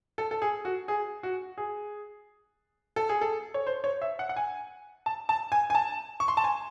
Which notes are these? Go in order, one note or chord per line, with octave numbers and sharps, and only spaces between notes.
A4
A4
G#4
F#4
G#4
F#4
G#4
A4
G#4
A4
C#5
C5
C#5
E5
F#5
F#5
G#5
A5
A5
G#5
G#5
A5
C#6
C6
A5
G#5